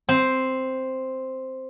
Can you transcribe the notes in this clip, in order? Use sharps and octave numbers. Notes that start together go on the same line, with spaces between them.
C4 C5